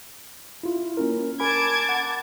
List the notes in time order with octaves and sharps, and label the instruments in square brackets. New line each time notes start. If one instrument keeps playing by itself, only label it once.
[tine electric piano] E4 F4
A#3 C#4 A#4
[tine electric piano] A#4 G#5 B5 [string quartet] A5 D6 G#6
[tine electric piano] F#5